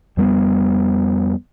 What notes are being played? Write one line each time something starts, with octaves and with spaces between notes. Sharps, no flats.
F2 G3 A3 B3